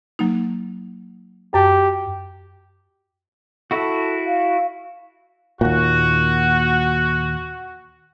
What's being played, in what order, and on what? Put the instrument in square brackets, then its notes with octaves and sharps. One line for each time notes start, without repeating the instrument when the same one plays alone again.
[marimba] F#3 A#3 D#4
[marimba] F#2 A5 [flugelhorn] G4
[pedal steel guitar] E4 F#4 [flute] A4
[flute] F5
[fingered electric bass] D#2 A#2 [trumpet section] F#4